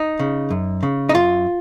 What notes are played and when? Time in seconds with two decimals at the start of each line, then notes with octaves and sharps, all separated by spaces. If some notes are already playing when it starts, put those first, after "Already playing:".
Already playing: D#4
0.19 C#3
0.50 F#2
0.83 C#3
1.09 D#4
1.14 F#2 F4